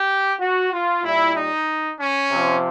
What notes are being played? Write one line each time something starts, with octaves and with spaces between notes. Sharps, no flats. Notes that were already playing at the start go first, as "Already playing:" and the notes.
Already playing: G4
F#4
F4
A#2 G3 E4
D#4
C#4
C3 F3